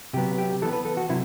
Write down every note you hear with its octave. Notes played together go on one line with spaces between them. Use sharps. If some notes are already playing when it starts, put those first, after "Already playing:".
C3 F#3 B3 G4
G4
E3 B3 A4
B4
A4
F#4
C3 F#3 E4